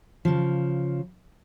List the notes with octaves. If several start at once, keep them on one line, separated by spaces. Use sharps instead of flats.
C#3 F3